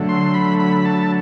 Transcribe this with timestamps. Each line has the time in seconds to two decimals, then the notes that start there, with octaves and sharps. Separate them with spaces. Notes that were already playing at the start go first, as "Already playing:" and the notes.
Already playing: D3 F#3 A3
0.09 C6
0.34 B5
0.59 B5
0.85 A5